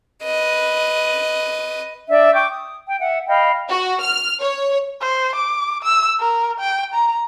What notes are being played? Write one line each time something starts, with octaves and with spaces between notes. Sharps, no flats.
B4 D#5
D4 D5 E5
G5 C#6 D6 G6
D#6
G5
E5 F#5
D#5 F5 G5 B5
F#4
F6
C#5
C5
D6
E6
A#4
G5
A#5